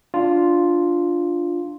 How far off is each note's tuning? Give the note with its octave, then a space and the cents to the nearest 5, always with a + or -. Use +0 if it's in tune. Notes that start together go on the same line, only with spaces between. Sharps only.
D4 +0 F4 +0